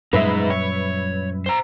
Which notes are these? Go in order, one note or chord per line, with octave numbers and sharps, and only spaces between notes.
F#2 A#2 G3 G#3 D#4 B4 E5
C#5
C5 A#5